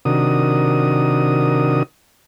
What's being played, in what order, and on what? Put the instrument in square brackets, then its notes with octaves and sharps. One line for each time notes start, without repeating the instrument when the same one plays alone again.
[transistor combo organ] C3 D#3 D4 F#4 A#4 D#6